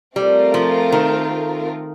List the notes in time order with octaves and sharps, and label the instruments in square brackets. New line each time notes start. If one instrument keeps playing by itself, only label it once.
[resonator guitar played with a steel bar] G3 [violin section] A3 C4 F4 A#4
[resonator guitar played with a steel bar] F3
D#3